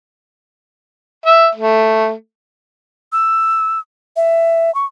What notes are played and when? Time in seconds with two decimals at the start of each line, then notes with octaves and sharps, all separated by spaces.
1.26 E5
1.55 A3
3.13 E6
4.16 E5
4.75 C#6